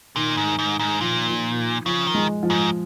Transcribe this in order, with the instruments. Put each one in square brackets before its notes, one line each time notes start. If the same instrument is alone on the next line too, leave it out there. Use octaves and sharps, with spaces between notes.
[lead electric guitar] A#2 [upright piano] D#3
[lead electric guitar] G#2
G#2
G#2
[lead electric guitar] A#2 [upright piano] F3
[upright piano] F3
[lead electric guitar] C#3 [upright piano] F3
[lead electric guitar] D#3
[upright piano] G#3
F3
[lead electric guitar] G#2